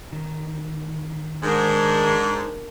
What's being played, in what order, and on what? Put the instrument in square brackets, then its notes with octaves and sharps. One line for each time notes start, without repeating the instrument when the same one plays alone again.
[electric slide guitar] D#3
[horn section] G#2 [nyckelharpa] D4 A#4